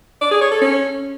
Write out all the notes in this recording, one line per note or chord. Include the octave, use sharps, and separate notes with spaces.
D5
G#4
C#5
A4
C#4